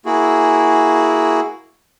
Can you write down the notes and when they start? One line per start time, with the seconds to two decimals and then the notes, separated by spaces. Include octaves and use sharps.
0.06 A#3 E4 F#4 G#4